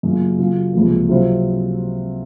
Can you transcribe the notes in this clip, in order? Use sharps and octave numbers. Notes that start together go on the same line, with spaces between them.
F#2 C#3 F#3 A#3 F4
C#3 F#3 C#4 F4
C#2 C3 F3 A#3
C3 F#3 C4 F4